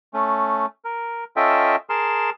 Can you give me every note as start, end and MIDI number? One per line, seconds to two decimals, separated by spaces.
0.14 0.66 57
0.14 0.66 61
0.85 1.24 70
1.36 1.76 61
1.36 1.76 65
1.36 1.76 69
1.36 1.76 75
1.36 1.76 76
1.36 1.76 79
1.90 2.30 68
1.90 2.30 70
1.90 2.30 81
1.90 2.30 84